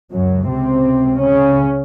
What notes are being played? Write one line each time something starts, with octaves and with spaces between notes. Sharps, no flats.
C#2 F#2 C#3 F#3
C3 C4
C#3 C#4